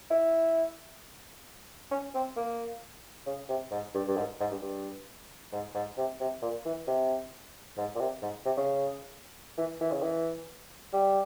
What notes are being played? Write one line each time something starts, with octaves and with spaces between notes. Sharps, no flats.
E4
C#4
C4
A#3
C#3
C3
G#2
G2
G2
G#2
G#2
G2
G2
G#2
G#2
C3
C3
A#2
E3
C3
G#2
A#2
C3
G#2
C3
C#3
E3
E3
C#3
E3
G3